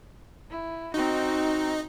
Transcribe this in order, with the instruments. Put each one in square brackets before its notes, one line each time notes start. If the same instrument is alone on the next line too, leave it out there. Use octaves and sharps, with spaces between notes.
[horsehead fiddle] E4
[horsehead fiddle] C4 F#4 [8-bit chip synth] D#4